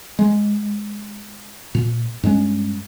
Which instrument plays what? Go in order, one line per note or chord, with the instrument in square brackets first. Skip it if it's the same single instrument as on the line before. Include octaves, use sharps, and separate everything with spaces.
[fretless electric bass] G#3
A#2
G2 G#3 C#4